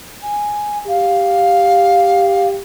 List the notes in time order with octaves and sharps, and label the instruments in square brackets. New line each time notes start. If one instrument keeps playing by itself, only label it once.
[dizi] G#5
[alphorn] G4 [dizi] F5